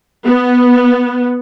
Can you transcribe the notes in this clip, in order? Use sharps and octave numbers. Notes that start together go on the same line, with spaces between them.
B3